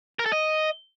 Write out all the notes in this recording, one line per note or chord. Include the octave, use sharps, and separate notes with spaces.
A#4
A4
D#5